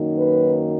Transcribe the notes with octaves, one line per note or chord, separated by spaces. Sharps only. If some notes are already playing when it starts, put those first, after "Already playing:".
Already playing: F#2 D#3 F#3 A#3 D#4
B4